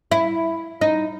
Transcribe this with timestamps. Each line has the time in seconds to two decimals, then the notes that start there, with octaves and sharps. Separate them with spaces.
0.12 E4
0.81 D#4